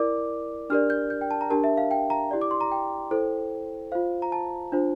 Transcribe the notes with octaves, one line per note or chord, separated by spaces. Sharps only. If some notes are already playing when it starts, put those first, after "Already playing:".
Already playing: E4 A#4 D5 D6
D4 G4 A#4 D5 F6
G6
G6
G5
A5
A#5
D4 G4 A#4 A5
E5
F5
G5
A#5
E4 G4 D5
D6
C6
A#5
G5
E4 A4 C5
F4 C5 F5
A#5
A5
D4 F4 C5